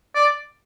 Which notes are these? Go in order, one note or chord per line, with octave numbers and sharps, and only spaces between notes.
D5